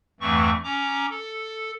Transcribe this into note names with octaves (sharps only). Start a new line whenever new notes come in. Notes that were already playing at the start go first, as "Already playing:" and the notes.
E2 G2 E3 A3 C4 C#6
C#4 A#5 D6
A4